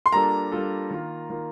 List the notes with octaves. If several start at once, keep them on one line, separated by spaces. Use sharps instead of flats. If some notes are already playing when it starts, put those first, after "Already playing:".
C6
G3 A#3 D4 F4 A4 A#5
G3 A#3 D4 F4 A4
D#3 A#3 F4
D#3 A#3 F4